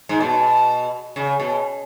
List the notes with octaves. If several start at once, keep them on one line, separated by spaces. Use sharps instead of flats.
G#2
B2
C#3
B2